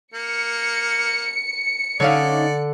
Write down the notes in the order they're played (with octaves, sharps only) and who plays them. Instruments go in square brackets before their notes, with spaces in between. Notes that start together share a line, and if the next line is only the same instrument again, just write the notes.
[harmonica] A#3 [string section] C#7
[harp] D3 [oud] C#4 D#4 F5 [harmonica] D5